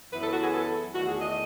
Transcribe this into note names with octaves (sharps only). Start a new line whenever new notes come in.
F#2 E3 B3 E4 B4
A4
F#4
G#4
A4
E2 D#3 A3 F#4
G#4
D#5